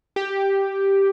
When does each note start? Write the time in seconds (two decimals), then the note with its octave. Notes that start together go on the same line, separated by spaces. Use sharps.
0.16 G4